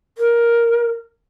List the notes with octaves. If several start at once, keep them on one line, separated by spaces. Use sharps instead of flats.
A#4